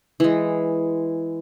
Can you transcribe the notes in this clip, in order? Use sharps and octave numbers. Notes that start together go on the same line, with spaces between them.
E3 G#3